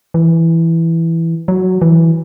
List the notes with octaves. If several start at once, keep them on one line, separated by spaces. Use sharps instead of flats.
E3
F#3
E3